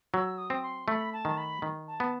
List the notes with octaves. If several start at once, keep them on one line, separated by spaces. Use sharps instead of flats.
F#3 E6
D#6
C4
C6
A3 B5
A5
D#3
B5
D#3
A5
B3